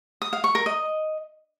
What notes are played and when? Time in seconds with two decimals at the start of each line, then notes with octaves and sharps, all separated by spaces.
0.22 D#6
0.33 F5
0.44 C#6
0.55 A#4
0.66 D#5